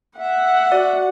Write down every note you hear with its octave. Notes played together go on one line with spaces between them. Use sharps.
E5 F#5
F#4 D5